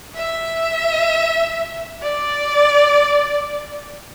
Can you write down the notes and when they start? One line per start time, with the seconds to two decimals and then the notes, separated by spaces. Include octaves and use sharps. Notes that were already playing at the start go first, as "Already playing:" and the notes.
0.15 E5
2.02 D5